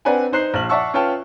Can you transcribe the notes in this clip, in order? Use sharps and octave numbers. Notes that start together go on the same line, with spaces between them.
C4 D4 B4 D5 F#5 G#5
D#4 C5 F#6 C7
A#1 F6 F#7
D5 E5 F#5 A5 C#6 E6
C#4 F4 B4 G5 A5